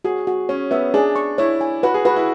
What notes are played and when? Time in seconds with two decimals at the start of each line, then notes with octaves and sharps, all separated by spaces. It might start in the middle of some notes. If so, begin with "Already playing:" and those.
0.04 F#4 G#4
0.27 F#4
0.49 C#4 C#5
0.71 B3 E5
0.94 D4 G#4
1.16 C#6
1.38 E4 C#5
1.61 G#5
1.83 F#4 B4
1.94 G#4
2.05 F#4 B4
2.16 E4